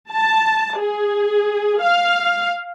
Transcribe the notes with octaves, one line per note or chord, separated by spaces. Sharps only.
A5
G#4
F5